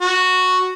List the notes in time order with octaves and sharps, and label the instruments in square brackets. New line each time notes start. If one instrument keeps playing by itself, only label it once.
[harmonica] F#4